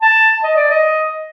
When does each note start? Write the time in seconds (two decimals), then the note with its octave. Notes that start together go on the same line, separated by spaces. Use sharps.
0.02 A5
0.44 D#5
0.56 D5
0.70 D#5